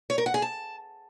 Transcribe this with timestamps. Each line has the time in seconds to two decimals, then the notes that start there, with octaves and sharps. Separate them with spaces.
0.10 C#5
0.18 A#4
0.26 F#5
0.34 G#4
0.42 A5